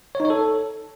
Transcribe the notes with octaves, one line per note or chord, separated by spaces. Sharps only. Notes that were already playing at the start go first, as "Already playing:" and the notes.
C#5
D#4
C#5
A4